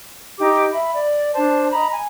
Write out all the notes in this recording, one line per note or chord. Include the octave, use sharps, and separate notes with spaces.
D#4 G4 D#5 D6
E5 B5
D5
D4 C5 A5
D#5 A#5 B5
G#5